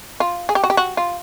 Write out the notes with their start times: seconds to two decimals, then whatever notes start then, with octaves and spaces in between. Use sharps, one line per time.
0.20 F4
0.49 G#4
0.55 G4
0.64 F#4
0.70 G4
0.77 F#4
0.97 F4